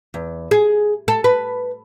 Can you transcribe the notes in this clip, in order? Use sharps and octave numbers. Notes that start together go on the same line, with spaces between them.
E2
G#4
A4
B4